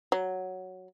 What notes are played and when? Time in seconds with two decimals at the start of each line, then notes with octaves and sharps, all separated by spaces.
0.12 F#3